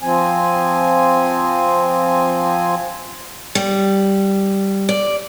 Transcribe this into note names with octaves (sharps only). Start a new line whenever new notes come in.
F3 C4 G#5
G3
D5